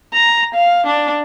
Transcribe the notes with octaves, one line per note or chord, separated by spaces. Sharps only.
A#5
F5
D4